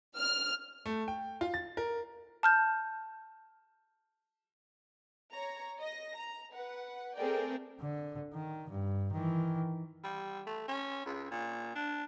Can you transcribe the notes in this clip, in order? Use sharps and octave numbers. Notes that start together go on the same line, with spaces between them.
F6
A3
G5
F4
A6
A#4
A5 F6 G6
C#5 A#5
D#5 A#6
A#5
B4 F#5
A3 C4 G#4 A#4 D5 G5
D3
D#3
G2
D#3 E3
G3
A3
C#4
C#2
A#2
D4